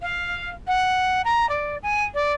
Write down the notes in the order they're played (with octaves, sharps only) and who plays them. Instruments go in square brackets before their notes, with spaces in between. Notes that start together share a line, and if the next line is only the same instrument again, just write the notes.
[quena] F5
F#5
A#5
D5
G#5
D5